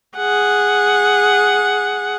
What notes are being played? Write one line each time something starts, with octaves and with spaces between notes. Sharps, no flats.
G#4 F#5